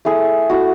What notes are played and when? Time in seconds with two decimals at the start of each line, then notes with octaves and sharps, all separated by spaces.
0.05 A3 E4 G#4
0.50 A3 E4 F#4